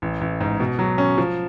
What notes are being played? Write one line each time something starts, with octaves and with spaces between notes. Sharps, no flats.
A1
A1
G#2
B2
F#3
C#4
F3